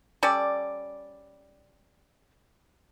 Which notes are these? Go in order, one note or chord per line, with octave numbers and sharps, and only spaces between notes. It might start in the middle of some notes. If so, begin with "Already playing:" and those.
G3 C#4 A4 D5